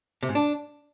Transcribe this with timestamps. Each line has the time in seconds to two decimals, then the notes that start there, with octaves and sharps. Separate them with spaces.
0.23 C3
0.29 G#2
0.35 D4